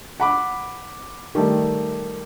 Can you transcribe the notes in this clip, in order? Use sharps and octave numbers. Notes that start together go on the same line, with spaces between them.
F#5 B5 D6
D#3 G3 A3